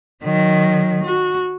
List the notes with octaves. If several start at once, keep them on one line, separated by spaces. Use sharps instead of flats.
D#3 F#3
F#4